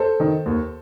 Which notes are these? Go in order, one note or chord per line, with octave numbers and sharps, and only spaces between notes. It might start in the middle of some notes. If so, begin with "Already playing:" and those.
Already playing: A4 C5
D#3
D#2